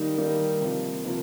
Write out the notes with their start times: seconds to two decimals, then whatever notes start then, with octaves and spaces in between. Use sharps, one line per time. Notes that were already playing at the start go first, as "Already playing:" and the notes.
Already playing: D#3 G3 A#3 D#4
0.18 D#3 G3 A#3 D#4
0.61 C3 F3 A#3
1.05 C3 F3 A#3